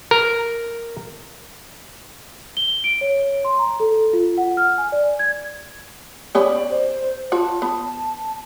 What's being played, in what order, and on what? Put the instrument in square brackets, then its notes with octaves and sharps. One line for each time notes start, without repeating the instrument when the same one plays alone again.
[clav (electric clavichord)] A#4
[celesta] G7
D7
C#5
C6
A#5
A4
F4
F#5
F6
G#5
D5
G#6
[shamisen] B3 C#4 G4 [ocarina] D5
[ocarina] C5
[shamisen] F4 F#4 [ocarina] A5
[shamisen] B3